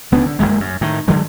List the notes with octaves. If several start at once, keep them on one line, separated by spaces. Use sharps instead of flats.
C#2 B3 C#4 D4
D3
F#1 D#2 G#3 A#3
F#2
A2 D#3
D3 F#3 G#3